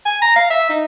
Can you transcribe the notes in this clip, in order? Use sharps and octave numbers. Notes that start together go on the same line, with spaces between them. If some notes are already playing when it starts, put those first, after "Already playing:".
G#5
A#5
F5
E5
D#4